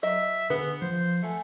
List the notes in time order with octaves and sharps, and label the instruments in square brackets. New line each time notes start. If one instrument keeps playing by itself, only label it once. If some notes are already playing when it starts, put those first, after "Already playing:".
[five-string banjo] F#3 D#5 [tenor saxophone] E5
[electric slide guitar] D3 G#4 [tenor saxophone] B3 [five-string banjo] B4
[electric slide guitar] F3 [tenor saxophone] C5
[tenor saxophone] A3 [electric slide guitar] A4 F#5 G#5